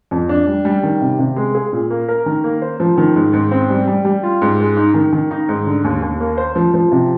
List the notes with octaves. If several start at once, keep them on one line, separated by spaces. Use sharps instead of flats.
F2
D4
G3
G3
D#3
C3
C3
G#3
G#4
A#2
A#3
A#4
D#3
A#3
C5
F3
D#3
G#2
G#2
C4
G3
G3
G3
F4
G#2
G#3
D#4
D#3
D#3
D#4
G#2
D3
D#2
D#2
A#3
C5
F3
F3
C3